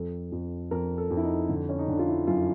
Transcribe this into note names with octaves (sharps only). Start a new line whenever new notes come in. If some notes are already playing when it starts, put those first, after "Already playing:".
Already playing: F2 A4
F2
F2 A#4
A4
F2
E4
D#4
D3
C#4
D#4
D3 D4
F4
E4
F#2 F4